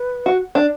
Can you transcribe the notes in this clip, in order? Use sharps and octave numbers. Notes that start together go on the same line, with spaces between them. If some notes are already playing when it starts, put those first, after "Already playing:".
Already playing: B4
F#4
D4